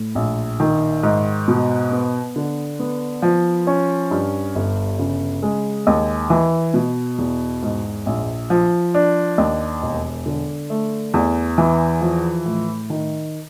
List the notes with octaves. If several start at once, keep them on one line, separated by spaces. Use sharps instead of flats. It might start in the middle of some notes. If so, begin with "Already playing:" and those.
Already playing: A2
A#1
D#3
G#2
B2
B3
D3
B3
F3
C#4
G2
G1
C#3
G#3
D#2
E3
B2
E2
G#2
A#1
F3
D4
D#2
E1
D3
A3
E2
E3
F3
A2
D#3